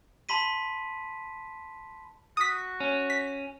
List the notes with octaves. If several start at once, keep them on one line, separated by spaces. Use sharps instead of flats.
A5 B5 C6 B6 D#7
F#4 D#6 B6
C#4
B6